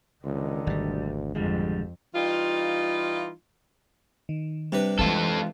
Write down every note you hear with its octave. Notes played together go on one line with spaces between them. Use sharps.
C#2 D3 D#3
G#1 D2 B2 G3
F2 D3 F3 G3 G#3
E3 G3 D#4 F4
D#3
C3 G3 D4 B4
E3 G#3 F4 A4